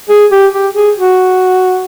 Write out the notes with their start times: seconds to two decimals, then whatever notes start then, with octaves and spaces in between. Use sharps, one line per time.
0.10 G#4
0.31 G4
0.53 G4
0.75 G#4
0.96 F#4